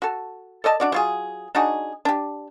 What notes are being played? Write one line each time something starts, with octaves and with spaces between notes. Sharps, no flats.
F#4 A4
A4 D5 D#5 A5
D4 F#4 D5
F#3 F4 G#4
D4 D#4 F#4 G#4
D4 G4